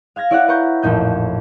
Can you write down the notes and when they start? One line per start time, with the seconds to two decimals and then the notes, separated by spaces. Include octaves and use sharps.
0.16 F5 F6 G#6 A#6
0.31 E4 C#5 D5 E5 F#5
0.48 B4 F#5 A#5 C#6 G6
0.82 A1 F2 A#2 D#4 G6